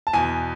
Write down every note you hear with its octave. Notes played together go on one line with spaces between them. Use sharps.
A5
E2 B2 G#5